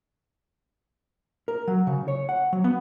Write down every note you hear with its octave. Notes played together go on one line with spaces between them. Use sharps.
A#4
F#3
C#3
C#5
F#5
F#3
B3